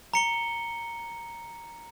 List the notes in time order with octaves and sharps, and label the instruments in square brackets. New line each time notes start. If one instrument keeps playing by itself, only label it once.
[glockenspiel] A#5 C#7 G7